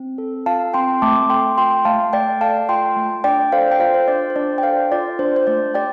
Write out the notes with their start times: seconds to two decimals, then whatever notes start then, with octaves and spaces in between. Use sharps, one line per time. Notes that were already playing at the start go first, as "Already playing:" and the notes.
Already playing: C4
0.18 A4
0.46 F4 F5 A5
0.74 C4 G5 C6
1.02 A3 A5 D6
1.30 A4 G5 C6
1.58 F4 G5 C6
1.85 A3 F5 A5
2.13 A3 D5 G5
2.41 A4 F5 A5
2.69 F4 G5 C6
2.96 A3
3.24 D4 D5 G5
3.52 A4 C5 F5
3.72 G5
3.80 F4 C5 F5
3.94 C5
4.08 D4 D5
4.30 C5
4.36 D4 D5
4.58 G5
4.63 A4 C5 F5
4.91 F4 D5
5.19 D4 C5
5.36 C5
5.47 A3 D5
5.74 G4 D5 G5